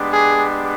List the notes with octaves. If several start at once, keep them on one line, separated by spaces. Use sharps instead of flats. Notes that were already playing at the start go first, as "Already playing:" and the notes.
Already playing: G#3 B3 D4 G4
G#4